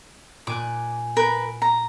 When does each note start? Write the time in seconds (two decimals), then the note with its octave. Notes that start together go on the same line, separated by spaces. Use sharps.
0.47 A#2 G#5 D6 F#6
1.17 A#4 B4
1.62 A#5